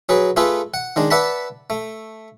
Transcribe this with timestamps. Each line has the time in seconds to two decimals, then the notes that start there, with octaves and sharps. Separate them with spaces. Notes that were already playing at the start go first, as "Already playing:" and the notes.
0.09 F#3 G#4 B4
0.36 A3 F4 G#4 A4 B4
0.74 F#5
0.96 D#3 G#3 D4
1.10 B4 D5 E5 F#5 A5 B5
1.70 A3